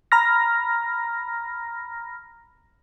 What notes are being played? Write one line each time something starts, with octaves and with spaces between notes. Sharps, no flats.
A#5 B5 F6 A#6